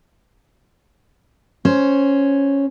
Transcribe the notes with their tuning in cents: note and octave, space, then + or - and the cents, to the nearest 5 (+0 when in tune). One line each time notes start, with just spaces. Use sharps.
C#4 +0 C5 +5